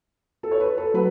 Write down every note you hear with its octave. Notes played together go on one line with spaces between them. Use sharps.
A4
C#5
B4
A4
F#3 B4